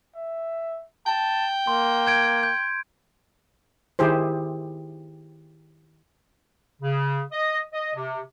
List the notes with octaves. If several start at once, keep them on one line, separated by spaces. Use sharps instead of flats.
E5
G5 A5
A#3 C6
G6 G#6 D7
G6
D#3 E4 G4 G#4 C5
C#3
D#5
D#5
C3